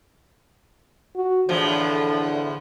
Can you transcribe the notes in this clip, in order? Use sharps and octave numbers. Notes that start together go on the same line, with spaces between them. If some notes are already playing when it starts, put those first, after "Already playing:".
F#4
E2 A2 D3 F3